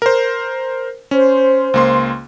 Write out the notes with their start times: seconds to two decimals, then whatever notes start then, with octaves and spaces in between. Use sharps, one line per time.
0.02 A#4 C5
1.11 C#4 C5
1.74 C#2 A#3 C6